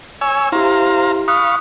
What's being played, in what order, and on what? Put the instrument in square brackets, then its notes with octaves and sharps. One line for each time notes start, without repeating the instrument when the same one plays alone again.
[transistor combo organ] C#5 G#5 E6
[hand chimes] E4 G4 [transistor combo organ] C5 F5 A#5
[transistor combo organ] F5 B5 C#6 [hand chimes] D#6 F#6